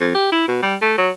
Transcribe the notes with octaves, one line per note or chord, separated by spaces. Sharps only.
F2
G4
E4
B2
G3
A3
F#3